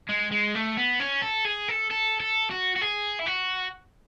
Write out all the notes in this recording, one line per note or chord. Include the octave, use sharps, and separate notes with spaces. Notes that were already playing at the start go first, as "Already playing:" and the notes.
G#3
G#3
A3
B3
C#4
A4
G#4
A4
A4
A4
F#4
F#4
G#4
E4
F#4